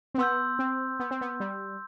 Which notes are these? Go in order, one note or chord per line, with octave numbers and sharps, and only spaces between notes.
C4
B3 C6 E6 G6
C4
B3
C4
B3
G3